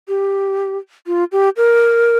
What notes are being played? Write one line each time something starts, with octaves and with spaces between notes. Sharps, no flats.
G4
F4
G4
A#4